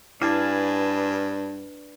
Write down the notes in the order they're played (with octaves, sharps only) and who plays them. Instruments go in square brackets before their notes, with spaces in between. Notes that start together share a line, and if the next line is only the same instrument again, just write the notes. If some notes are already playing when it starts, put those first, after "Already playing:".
[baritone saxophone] G2 [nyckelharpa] D4 B4 [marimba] E4 [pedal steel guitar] F5 G#5 A5